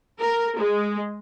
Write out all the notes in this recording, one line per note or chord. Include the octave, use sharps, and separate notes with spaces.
A#4
G#3